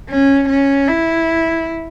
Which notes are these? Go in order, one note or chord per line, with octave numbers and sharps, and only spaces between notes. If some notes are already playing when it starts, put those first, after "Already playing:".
C#4
C#4
E4